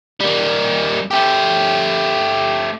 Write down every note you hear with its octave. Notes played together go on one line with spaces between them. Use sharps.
G3 A#3
A3 G4